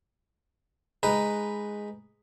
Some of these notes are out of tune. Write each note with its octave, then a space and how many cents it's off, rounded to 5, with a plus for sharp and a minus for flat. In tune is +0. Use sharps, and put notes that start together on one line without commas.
G#3 +0 D#4 +0 B4 +0